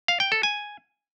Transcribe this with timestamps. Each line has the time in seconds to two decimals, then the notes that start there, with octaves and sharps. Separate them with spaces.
0.08 F5
0.20 G5
0.32 A4
0.43 G#5